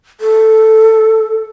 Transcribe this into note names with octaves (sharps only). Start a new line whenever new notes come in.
A4